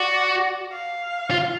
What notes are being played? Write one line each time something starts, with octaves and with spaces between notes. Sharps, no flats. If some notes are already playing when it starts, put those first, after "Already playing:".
Already playing: F#4 D5
F5
F4